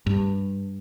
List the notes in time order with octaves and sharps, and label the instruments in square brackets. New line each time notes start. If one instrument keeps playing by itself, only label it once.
[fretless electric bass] G2